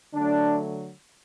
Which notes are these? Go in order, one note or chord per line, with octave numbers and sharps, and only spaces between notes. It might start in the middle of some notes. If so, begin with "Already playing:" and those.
D3 F#3 A3 D4